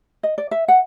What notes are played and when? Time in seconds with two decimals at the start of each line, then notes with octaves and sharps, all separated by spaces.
0.23 D#5
0.38 D5
0.51 E5
0.68 F#5